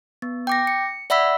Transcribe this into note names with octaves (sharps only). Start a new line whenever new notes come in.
B3
G5 D6 A#6
C#7
D5 E5 F#5 B5 E6 B6